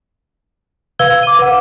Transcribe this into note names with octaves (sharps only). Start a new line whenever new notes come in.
B4 F5 E6 G#6 G7
D6 D#7
B4 F#5